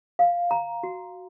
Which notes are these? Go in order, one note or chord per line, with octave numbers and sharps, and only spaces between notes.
F5
A#5
F#4